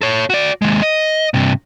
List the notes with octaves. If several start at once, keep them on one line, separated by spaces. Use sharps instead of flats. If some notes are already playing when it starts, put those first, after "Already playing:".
A4 C#5
F#4 D5
D#2 G#3
D#5
G2 C3